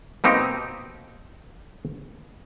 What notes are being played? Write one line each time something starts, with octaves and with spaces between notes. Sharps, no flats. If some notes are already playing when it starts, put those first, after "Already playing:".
B2 A#3 C4 D#4 G4